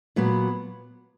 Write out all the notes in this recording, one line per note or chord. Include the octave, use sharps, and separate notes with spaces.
A#2 F#3 B3